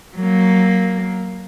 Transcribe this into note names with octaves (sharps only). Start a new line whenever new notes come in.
F#3 A#3